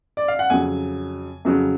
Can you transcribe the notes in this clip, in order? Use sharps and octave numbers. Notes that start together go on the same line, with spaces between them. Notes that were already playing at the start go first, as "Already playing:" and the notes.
D5
F5
F#5
F2 C#3 F#3 G#5
F2 C#3 F#3